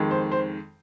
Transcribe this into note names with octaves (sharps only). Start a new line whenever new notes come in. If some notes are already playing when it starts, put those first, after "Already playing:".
Already playing: F2 D#3 G#3
C5
C5